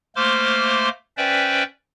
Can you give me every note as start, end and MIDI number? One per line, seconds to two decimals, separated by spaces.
0.16 0.89 57
0.16 0.89 58
0.16 0.89 72
0.16 0.89 84
0.16 0.89 86
0.16 0.89 89
1.17 1.63 61
1.17 1.63 71
1.17 1.63 72
1.17 1.63 74
1.17 1.63 76
1.17 1.63 79